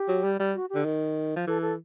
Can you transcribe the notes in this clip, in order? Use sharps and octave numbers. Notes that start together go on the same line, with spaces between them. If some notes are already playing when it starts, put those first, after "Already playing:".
Already playing: G4
F#3
G3
G3
F#4
G4
D3
D#3
F3
E3 A4
A4